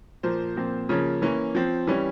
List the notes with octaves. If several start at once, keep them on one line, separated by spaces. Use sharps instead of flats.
A#2 F3 A#3 C5
A#2 F3 C4
C#3 F3 A#3 C#4 C#5
E3 A#3 C#4
F3 C4
E3 G3 C#4